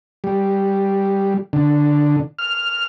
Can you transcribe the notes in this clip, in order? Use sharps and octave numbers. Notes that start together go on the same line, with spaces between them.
G3
D3
F6